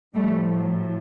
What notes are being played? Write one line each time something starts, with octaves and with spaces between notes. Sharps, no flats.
A2 F3 G3 A3
F#3